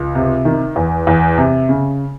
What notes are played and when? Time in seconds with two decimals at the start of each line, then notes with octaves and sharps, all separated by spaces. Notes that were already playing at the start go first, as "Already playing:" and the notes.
Already playing: C#2
0.15 C3
0.45 D#3
0.76 E2
1.07 E2
1.38 C3
1.69 C#3